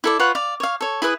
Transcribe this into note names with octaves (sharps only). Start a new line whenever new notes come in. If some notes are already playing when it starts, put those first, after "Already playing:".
E4 A4 D5
F4 B4 C#5 F#5
D5 F5
C#5 F5
A4 C#5
E4 G#4 B4 D#6